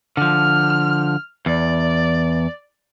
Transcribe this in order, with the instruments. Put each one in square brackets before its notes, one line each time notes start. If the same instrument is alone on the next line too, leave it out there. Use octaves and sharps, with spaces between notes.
[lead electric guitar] D3 F3 [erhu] F6
[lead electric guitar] E2 [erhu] D5